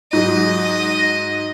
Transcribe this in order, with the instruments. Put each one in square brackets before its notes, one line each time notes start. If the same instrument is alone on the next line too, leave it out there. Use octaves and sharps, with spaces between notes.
[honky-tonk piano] G#2 F#3 [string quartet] D#5